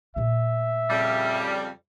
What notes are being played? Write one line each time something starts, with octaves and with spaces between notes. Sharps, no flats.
A#2 A3 E5
F2 C#3 G3